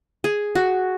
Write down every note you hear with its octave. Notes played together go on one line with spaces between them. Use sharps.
G#4
F#4